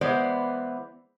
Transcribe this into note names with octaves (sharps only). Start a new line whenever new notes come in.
E3 G#3 B3 C5 D5